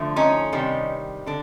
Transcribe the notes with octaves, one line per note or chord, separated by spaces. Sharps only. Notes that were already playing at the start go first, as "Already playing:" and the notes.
Already playing: D3 F3 A3
C#4 D#4
C3 D#3 G3
D3 D4